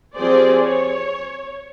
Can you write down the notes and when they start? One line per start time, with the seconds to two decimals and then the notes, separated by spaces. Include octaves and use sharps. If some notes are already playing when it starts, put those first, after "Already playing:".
0.16 F3 C4 G4 G#4 C5 D5
0.65 C#5